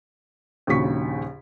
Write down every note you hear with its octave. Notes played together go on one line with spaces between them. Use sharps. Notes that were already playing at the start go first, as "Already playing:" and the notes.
A#1 D#2 C#3 F#4 C#6 B6